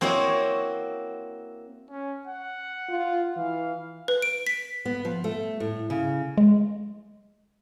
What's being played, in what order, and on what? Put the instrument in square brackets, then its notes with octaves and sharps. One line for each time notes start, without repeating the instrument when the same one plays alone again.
[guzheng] A#3 C4 E4 F#4 C#5 D#5
[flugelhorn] C#4
F#5
[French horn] F4
[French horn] E3 [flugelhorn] F5
[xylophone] B4
D7
B6
[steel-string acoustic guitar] B3
F3
A3
A2
C#3
[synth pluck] G#3